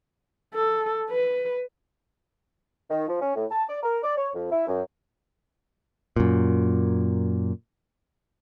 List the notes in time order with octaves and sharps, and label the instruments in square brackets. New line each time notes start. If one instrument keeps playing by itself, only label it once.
[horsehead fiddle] A4
B4
[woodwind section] D#3
F3
C#4
A2
A5
D5
A#4
D5
C#5
F2
E4
F#2
[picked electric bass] F#2 A#2